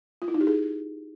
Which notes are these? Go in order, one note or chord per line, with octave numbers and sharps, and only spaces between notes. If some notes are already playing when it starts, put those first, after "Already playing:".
F4
E4
D#4
G4
G#4